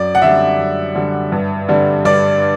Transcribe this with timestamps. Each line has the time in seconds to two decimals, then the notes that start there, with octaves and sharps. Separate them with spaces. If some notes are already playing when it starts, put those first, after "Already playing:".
Already playing: F#2 D5
0.15 F#5
0.22 D3 G3 E5
0.58 F#2
0.95 D3 G3
1.32 G2
1.69 D3 G3
2.05 G2 D5